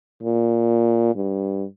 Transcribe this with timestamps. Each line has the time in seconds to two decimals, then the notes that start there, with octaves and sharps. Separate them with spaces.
0.23 A#2
1.15 G2